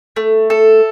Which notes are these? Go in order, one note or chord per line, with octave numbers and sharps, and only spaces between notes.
A3
A4